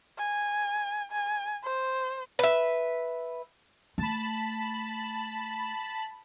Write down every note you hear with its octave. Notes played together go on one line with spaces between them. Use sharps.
G#5
G#5
C5
B4 E5
A3 A5 B5